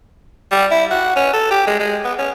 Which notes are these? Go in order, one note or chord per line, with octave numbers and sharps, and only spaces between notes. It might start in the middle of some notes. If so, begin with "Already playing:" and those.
G3
E4
F#4
C#4
A4
G4
G#3
G#3
B3
C#4